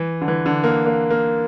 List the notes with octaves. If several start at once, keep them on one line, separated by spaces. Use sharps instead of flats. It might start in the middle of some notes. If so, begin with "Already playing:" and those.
Already playing: E3
D3
E3
D3
A#3
A#3
A#3